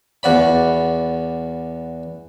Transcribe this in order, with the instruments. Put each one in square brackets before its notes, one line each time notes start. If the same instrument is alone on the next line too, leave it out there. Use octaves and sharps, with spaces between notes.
[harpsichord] E2 F#4 D5 B5